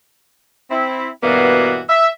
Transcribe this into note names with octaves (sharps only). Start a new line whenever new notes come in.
C4 E4
G2 B2 E3 A#3 B3 F#4
E5